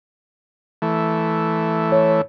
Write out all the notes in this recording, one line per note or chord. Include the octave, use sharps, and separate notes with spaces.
E3 A3
C#5